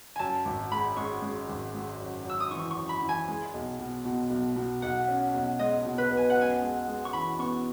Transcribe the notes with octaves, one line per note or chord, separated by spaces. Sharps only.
F#2 G#5 A5
G#1
G#3 B5
G#3 C#6
G#3
G#1
G#3
F#2
F#2 E6
D#6
E3 C#6
C#6
F#2
B5
E3
G#5
G#3
B1
B2
B2
B1
B2
B1 F#5
C#4
B1
G#3 D#5
B2
B4
B1
G#5
F#5
F#2
G#5
G#3
G#3
C#6
E3 B5
B3 C#6